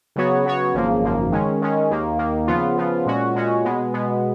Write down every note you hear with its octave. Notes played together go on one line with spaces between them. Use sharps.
C#3 F#3 B3 F#4 C#5
C#3 F#3 B3 F#4 C#5
G#1 F#2 C#3 F3 A#3
G#1 F#2 C#3 F3 A#3
D#3 G#3 C#4
D#3 G#3 C#4
D#2 D#3 A#3
D#2 D#3 A#3
C#3 F3 B3 F4
C#3 F3 B3 F4
A#2 G#3 C#4 F#4
A#2 G#3 C#4 F#4
B2 G#3 B3
B2 G#3 B3